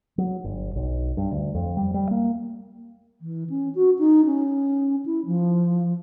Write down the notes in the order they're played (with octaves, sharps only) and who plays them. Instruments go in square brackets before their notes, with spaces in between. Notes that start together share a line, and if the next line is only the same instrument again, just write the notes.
[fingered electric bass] F#3
G1
B1
G2
D2
F2
G3
G3
A#3
[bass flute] E3
C#4
F#4
D#4
C#4
E4
F3